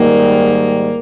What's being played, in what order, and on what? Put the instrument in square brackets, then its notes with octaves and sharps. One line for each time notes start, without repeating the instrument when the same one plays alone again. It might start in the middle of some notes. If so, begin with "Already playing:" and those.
Already playing: [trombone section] G#2 D#3 G3 [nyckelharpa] A#3